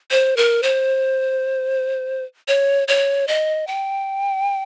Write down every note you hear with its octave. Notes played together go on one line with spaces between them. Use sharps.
C5
A#4
C5
C#5
C#5
D#5
G5